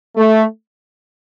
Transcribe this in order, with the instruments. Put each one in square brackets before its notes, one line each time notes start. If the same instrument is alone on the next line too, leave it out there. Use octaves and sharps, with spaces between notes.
[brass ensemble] A3